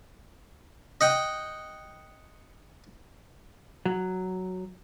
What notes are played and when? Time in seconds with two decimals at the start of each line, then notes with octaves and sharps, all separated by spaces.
1.01 D#5 F#5 G5
3.85 F#3